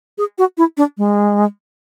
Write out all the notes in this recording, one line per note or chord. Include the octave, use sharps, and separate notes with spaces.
G#4
F#4
E4
D4
G#3